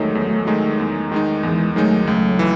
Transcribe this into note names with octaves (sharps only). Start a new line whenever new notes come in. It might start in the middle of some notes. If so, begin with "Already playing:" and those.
Already playing: E2 D#3 F#3 G#3 A3 D#4
E2
D#3 G#3 D#4
E2
D#3 G#3 D#4
E2 E3 G#3
D#3 F#3 G#3 A3 D#4
C#2 F#3 A3
E3